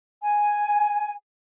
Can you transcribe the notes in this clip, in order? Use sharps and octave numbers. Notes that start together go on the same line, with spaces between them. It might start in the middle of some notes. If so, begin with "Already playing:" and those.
G#5